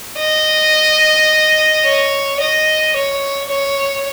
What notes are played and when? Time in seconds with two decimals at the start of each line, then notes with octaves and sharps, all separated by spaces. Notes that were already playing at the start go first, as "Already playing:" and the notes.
0.19 D#5
1.85 C#5
2.40 D#5
2.96 C#5
3.50 C#5